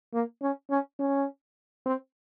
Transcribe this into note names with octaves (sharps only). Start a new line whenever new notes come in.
A#3
C#4
C#4
C#4
C4